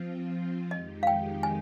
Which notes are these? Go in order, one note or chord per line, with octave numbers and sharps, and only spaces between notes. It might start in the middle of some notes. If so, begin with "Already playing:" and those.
Already playing: F3 C4 F4
F2 D#3 G#3 D#4 G4 D#5
F5
G5
G#5